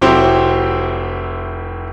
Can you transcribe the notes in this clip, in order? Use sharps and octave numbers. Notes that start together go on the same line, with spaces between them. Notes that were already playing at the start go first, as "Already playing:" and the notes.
F1 F#3 C4 E4 G4 C6